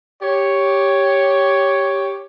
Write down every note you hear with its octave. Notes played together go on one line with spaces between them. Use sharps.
G4 C#5